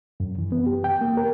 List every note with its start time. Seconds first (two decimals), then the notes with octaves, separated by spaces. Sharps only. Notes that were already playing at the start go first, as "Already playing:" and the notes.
0.20 F#2
0.38 E3
0.52 B3
0.67 G4
0.84 G5
1.01 A#3
1.17 A#4